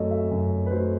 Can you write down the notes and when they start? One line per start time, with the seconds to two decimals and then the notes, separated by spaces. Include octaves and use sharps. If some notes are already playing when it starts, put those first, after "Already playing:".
Already playing: F#2 F#3 A3 A4 D#5
0.11 E5
0.31 F#2
0.66 B4
0.71 F#3 A3 C5